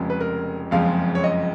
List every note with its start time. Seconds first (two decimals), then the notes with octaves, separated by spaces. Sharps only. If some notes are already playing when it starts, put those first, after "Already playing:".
Already playing: F1 F2 C#3 F3 G#3
0.10 B4
0.20 A#4
0.71 F#1 F2 C#3 F3 G#3 F5
1.15 C#5
1.24 D#5